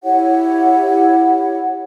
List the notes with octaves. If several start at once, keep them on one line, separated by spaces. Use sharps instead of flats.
E4 G4 C#5 F#5